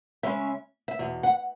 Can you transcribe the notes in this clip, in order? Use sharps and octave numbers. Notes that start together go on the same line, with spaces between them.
C#3 G#3 C#4 E5
E5
E2 B2
F#5